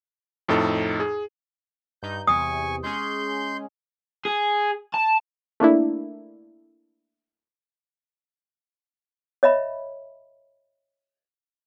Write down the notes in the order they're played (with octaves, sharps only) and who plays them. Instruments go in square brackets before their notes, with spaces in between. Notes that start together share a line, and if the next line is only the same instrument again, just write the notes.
[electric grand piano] F2 A2 D#4 A4
G#4
[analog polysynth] G2 D#4 [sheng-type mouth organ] G6
[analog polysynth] E2 C3 [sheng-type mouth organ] G#5 C#6 [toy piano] D#6
[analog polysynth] G#3 C#4 G#4 [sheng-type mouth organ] C6 G6
[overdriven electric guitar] G#4
A5
[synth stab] A3 A#3 D4 E4
[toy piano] C#5 D#5 E5 B5